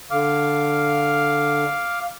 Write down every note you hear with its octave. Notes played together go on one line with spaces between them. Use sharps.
D3 F5 D6 F6